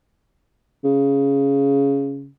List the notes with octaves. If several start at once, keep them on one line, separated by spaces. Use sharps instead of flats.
C#3